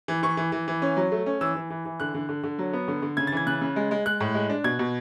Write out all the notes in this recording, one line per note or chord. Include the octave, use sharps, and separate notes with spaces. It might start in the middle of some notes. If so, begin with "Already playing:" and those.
E3
E3 C#6
E3
E3
E3
C#4
F#3
A3
C#4
E3 E6
E3
E3
E3
D3 F#6
D3
D3
D3
F#3
B3
D3
D3
C#3 G#6
A6
E3 G#6
C#3 F#6
C#3
G#3
G#3
G#3 F#6
A2
G#3
D4
B2 G#6
B2